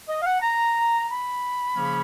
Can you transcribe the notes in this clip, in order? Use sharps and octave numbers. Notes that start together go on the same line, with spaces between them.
D#5
F5
F#5
A#5
B5
C#3 F3 A#3 C#4